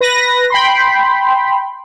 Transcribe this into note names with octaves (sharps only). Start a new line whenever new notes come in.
B4 A#6
G5 B5 C6